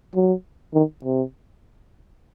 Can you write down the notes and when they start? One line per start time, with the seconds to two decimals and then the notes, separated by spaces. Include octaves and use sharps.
0.15 F#3
0.74 D#3
1.04 C3